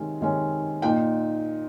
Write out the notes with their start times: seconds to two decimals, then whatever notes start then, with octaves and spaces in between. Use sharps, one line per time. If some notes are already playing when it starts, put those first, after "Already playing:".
Already playing: C3 D#3 G#3 C#4
0.21 C3 D#3 G#3 C#4
0.82 A#2 D#4 G5